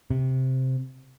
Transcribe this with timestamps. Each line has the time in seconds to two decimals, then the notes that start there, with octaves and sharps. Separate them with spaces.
0.10 C3